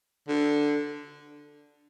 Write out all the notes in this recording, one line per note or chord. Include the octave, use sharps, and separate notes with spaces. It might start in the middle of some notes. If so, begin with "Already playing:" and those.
D3